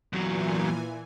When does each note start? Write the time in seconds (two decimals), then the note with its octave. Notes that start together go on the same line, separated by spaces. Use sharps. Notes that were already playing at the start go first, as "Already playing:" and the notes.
0.13 E2 A#2 E3 F#3 G#5